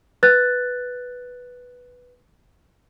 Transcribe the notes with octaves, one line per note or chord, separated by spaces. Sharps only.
B4 F#6 A6